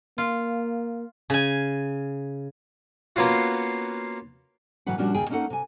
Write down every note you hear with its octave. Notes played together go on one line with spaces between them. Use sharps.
A#3 F4
C#3 G#5
A#3 B3 C#4 F4 F#4
A2 C#3 E3 F#3 B4 F#5
A#2 F3 G3 C#4 D4 F#4
D#2 C#3 G#4 G5
A3 A#3 C#4 D#4 A4 F#5
C3 G#5